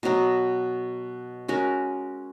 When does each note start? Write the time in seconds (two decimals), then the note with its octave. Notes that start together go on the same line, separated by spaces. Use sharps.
0.03 B2 F#3 B3
1.48 G#3 C#4 F#4 A#4